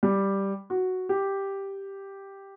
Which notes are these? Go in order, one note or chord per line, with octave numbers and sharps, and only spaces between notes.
G3
F#4
G4